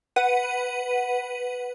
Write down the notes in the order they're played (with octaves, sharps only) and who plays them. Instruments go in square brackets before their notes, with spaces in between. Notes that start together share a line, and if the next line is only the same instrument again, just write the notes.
[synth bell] B4 F#5 D#7